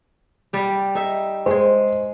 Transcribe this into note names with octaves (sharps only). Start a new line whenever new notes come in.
G3 G4
D#4 E5
G#3 G#4 C5